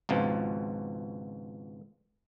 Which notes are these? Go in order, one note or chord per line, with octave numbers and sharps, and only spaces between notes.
G#1 C#2 B2 F3